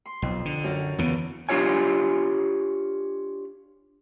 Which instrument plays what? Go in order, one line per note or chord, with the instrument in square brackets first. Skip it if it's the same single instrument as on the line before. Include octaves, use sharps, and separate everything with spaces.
[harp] C6
[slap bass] B1 [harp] F2
[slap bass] D3
[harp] F#2
[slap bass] E2 C#3 [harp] B3
[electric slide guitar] D4 F4 G4 C#5 G#5